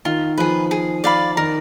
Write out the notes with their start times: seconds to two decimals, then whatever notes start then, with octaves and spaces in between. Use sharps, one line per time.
0.05 D#3 F4
0.38 F3 G#4 B4
0.71 G#4
1.04 D5 F5 B5
1.37 D#3 A#4